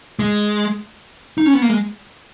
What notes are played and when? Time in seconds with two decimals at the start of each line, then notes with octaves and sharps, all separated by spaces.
0.19 G#3
1.38 D#4
1.46 C#4
1.54 B3
1.62 A#3
1.70 G#3